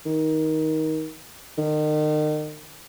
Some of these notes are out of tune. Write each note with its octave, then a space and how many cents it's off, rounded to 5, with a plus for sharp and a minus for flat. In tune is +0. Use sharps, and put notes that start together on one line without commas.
D#3 +15
D#3 -35